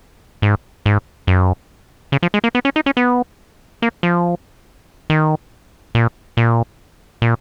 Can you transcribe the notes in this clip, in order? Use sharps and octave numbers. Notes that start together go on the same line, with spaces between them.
G#2
G#2
F#2
C#3
F3
G#3
A#3
B3
C#4
D#4
C#4
B3
A#3
F3
D#3
A#2
A#2
A#2